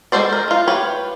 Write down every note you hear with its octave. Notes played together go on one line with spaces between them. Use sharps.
G#3 C4 A4 C5 D5
A#4
D#4 F4
G4 B4 C#5